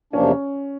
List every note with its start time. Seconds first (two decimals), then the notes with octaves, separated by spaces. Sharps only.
0.13 E2 C3 F3 A#3 C#4 D4